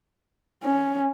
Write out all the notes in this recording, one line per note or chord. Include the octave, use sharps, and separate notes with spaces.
C#4